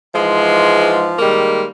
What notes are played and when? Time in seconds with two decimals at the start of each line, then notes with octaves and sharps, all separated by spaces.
0.15 G#2 E3 F3 G#3
1.19 D#3 G3 G#3 A#3